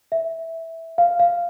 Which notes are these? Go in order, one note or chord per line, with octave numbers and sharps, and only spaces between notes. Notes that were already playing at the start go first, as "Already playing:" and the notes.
E5
F5
F5